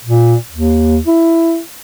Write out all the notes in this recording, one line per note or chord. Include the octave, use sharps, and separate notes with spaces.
A#2
D#2
E4